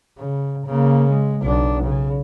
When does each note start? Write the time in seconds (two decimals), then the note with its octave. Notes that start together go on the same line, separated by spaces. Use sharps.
0.18 C#3
0.66 C#3 A#3
1.09 G#3
1.42 B1 D4
1.83 C#3